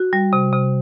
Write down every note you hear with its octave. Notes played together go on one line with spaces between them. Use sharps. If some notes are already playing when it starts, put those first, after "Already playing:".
Already playing: F#4
G3
C3
C3